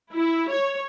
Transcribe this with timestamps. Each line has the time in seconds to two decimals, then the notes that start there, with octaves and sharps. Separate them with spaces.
0.14 E4
0.52 C#5